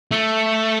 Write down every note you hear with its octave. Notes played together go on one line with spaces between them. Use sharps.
A3